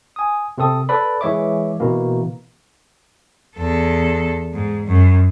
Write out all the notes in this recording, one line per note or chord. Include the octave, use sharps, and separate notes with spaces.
G#5 D#6
C3 C4 A4 D#6
A4 B4 D5 B5
E3 G#3 C#5 E5 D6
B2 E3 A#3
E2 A4
G#2
F#2